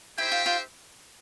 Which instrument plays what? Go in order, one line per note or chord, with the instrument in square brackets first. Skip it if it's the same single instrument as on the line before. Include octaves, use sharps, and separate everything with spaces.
[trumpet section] D#4 G4 C5 E5 G5 [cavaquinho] E4
[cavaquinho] F4
F4